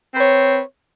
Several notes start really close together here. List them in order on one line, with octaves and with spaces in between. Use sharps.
C4 B4 C#5